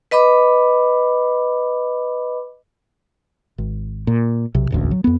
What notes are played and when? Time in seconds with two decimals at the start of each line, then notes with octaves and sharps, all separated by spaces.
0.11 B4 D#5 B5 D6
3.58 G#1
4.07 A#2
4.54 B1 C3
4.71 E1 A1 D2
4.91 F#3
5.04 F2 B3